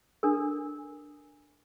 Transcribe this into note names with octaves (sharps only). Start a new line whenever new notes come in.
D4 A4 A#4